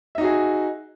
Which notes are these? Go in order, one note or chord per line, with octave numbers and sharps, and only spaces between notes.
D#4 F#4 G#4 E5